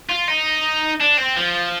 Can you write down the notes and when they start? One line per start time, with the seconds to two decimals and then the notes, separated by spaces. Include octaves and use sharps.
0.09 F4
0.28 D#4
1.00 D4
1.17 C4
1.36 F3